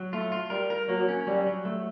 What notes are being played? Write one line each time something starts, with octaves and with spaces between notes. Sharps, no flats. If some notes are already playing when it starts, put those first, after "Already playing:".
Already playing: F#3
A3 F4
F4
G3 A#4
A#4
F#3 A#3
C#4
F#3 G3
F#3
A3